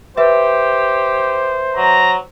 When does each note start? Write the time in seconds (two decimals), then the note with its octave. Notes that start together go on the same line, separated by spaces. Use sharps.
0.17 G4 B4 C5 E5
1.76 F#3 A#5